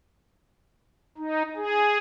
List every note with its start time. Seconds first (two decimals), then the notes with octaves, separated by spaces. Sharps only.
1.18 D#4
1.56 G#4